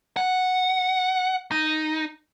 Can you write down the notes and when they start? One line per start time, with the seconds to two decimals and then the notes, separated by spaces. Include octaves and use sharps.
0.17 F#5
1.52 D#4